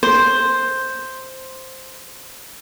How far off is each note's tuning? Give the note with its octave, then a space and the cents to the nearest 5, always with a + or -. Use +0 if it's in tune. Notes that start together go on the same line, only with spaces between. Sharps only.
C5 +0